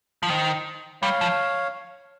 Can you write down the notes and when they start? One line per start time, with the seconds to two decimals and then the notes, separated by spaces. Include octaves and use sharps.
0.23 F3
0.29 D#3 C5 D#5
1.02 G3 C#5 F5
1.21 F3